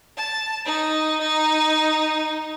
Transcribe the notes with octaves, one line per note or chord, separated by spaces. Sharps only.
A5
D#4
D#4